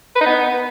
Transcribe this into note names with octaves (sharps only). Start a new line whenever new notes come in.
B4
D#4
B3